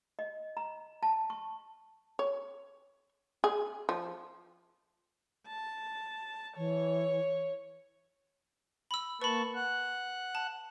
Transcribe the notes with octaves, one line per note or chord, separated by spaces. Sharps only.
D#5
A#5
A5
C#6
C#5
G#4
F3
A5
E3 C#5
B5 E6
A#3 B4 A5 B5 C#6
F#5 F#6
A5